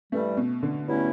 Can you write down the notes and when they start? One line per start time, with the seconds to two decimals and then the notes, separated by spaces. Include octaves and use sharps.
0.12 G2 E3 G3 A3
0.37 B2
0.63 D3
0.87 G2 F#3 A3 C#4 E4